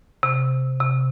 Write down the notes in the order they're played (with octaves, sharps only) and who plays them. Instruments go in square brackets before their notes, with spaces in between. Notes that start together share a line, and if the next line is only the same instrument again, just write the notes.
[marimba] C3
C3